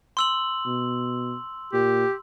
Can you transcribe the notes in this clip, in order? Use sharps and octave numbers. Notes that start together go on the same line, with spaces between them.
C6 E6 F#7
B2
A#2 G4